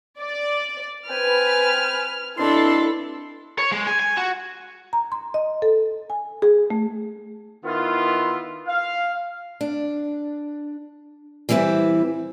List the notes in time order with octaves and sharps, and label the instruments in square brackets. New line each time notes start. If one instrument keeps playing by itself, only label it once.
[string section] D5
[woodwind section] C4 G5 G#5 [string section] B4 [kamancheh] F6
[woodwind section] B2 C4 C6 [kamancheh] D4 E4 [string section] A4
[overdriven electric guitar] C#5
G#3
G#5
G#5
F#4
[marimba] A#5
C6
D#5
A4
G#5
G#4
A3
[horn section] D#3 B3 E4 F4
F5
[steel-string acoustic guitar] D4
E3 G3 C4 E4 B4